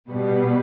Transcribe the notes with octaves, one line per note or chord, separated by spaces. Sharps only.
B2 G3 B3 B4